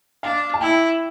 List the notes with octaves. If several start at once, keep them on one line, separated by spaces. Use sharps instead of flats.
D4 F5
A5
E4 G5